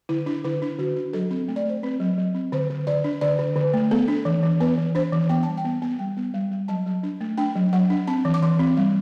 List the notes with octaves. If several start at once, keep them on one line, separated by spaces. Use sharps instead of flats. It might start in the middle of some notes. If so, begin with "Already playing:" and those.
D3 E4
D4 E4
D3 E4
D4
D3 F#4
D4
F#3 A4
C4
A3
D5
A3 C5
C4 B4
F#3
F#3
C4
D3 C5
D3
D3 D5
D4
D3 D5
D3
D3
A3
B3 A4
D4
E3
E3
B3 B4
E3
D4 C5
E3
B3 G5
G3 A5
G5
B3
B3
G3 G5
B3
G3
G3
F#3 A5
F#3
D4
A3
D4 G5
F#3
F#3 F#5
D4
C4 A5
E3
D6
E3 C6
C4
G3